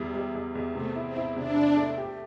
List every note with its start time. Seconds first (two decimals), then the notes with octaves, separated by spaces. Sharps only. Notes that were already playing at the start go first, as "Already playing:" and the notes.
Already playing: E2 G3 E4
0.14 G3
0.35 E2
0.55 E2
0.75 C3 A3
0.95 E4
1.06 C4
1.16 E4
1.36 C3 D4
1.56 C3
1.77 A3
1.98 G4